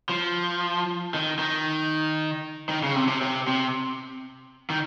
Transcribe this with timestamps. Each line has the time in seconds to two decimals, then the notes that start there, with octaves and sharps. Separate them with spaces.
0.09 F3
1.14 D#3
1.39 D#3
2.69 D#3
2.83 C#3
2.96 C3
3.08 C3
3.21 C3
3.48 C3
4.70 D#3